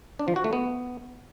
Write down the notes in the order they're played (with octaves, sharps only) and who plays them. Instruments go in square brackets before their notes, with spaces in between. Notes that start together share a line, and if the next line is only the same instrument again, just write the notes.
[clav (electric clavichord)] D4
F3
F#4
A3
B3